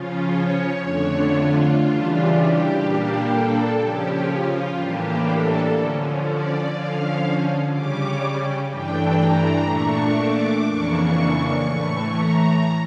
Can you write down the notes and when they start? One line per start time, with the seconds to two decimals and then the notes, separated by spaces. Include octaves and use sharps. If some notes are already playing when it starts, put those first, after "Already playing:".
Already playing: C#3 F3 C#4 F4
0.33 C#5
0.82 F2 D3 A3 D4 C#5
1.32 F4
1.81 C#3 E3 G3 D4
2.30 G4
2.79 A#2 G3 A#3 D4
3.29 A4
3.77 C#3 F3 C#4 G4
4.27 F4
4.76 A2 E3 G3 A#3 D4 G4
5.25 A4
5.74 D3 F3 C#4
6.24 D5
6.73 D3 F3 C#4 F5
7.71 C#3 G3 C#4 D6
8.70 G2 E3 A3 D4 G5
9.19 A#5
9.68 A#2 A3 D4 C#6
10.17 D6
10.66 F2 C#3 E3 A#3 D4 C#6
11.65 A2 E3 A3
12.15 A#5